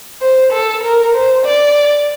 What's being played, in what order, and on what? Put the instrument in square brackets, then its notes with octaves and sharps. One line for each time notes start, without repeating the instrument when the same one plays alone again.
[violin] C5
A4
A#4
C5
D5